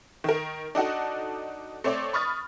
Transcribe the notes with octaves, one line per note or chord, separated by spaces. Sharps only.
D#3 A#4
D4 D#4 F#4 A4
A3 C4 C#5 D5
B5 C#6 D#6 F6 A6